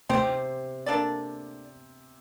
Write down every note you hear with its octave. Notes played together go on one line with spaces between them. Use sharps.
C3 C4 G4 C5
A#3 D4 A4 D5